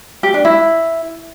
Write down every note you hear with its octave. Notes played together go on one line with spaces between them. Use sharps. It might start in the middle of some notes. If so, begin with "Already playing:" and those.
G4
D4
E4